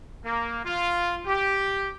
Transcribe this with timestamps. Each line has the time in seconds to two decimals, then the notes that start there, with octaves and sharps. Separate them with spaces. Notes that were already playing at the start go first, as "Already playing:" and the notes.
0.25 A#3
0.64 F4
1.26 G4